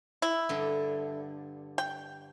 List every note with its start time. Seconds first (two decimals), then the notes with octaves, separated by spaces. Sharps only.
0.22 E4
0.49 G2 D3
1.78 G5